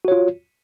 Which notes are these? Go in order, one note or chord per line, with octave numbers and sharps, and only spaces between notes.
F4 F#4 C#5